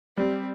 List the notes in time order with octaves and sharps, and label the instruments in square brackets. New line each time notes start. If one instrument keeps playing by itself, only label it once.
[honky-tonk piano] G3 [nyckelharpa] C4